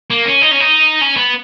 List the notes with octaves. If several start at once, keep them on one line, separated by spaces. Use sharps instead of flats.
A#3
C#4
D#4
C#4
D#4
C#4
B3